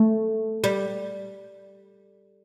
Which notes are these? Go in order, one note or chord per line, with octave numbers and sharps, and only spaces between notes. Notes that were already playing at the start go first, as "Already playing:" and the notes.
Already playing: A3
G3